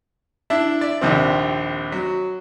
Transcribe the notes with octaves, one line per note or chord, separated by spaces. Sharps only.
D4 E4 E5
D5 E5
A#1 D#2 C3 C4
F#3